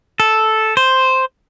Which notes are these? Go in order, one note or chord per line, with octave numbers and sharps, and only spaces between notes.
A4
C5